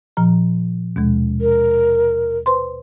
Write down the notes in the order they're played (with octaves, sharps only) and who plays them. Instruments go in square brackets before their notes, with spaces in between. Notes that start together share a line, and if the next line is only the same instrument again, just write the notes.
[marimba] A#2 F3 A#5
D#2 B2 G#3
[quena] A#4
[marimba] B4 C5 C6